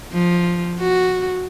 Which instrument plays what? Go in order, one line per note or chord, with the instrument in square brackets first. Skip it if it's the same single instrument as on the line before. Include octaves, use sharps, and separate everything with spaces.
[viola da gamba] F3
F#4